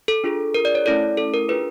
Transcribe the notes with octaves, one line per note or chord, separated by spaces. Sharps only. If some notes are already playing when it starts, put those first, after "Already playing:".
A4
D4 F4 G#4
A#4
D5
C#5
A3 C#4 E4 A4 D5
A4
A#4
D4 F4 G#4 B4